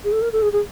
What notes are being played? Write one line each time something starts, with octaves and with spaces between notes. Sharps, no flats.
G#4
A4
A#4
A4
G#4
G#4